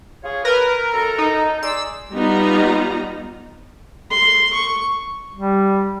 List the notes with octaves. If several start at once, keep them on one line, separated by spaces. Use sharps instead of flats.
F4 G#4 C#5
A#4 B4
F#2 A4 A#5
D#4
G#4 D5 C6 E6
G3 B3 D#4 F4 A#5
C6
C#6
G3